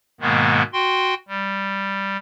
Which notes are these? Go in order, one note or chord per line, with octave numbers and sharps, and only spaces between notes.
G#2 B2 D#3 G#3 A#3 B3
F#4 G5 C6
G3